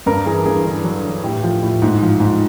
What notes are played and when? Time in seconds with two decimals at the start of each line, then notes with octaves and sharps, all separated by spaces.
0.06 G2 A#4
0.26 E3 G#4
0.46 G2 G#4
0.65 D3
0.84 F#3
1.03 D3
1.24 A2 G4
1.43 F3
1.63 A2
1.82 G#2
2.02 F3
2.20 G#2